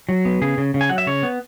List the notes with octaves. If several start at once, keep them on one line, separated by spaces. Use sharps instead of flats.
F#3
B3
C#3 G#4
C#3
C#3
G#5
F#3 F#5
E5
C#3 C#5
B3